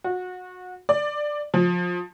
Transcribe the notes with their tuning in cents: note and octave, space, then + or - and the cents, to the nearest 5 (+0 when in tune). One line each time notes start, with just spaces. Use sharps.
F#4 -25
D5 +10
F3 +20